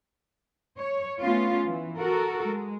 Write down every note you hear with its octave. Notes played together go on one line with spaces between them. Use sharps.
C#5
A3 B3 C#4 F4
E3
F#4 A4 A#4
G#3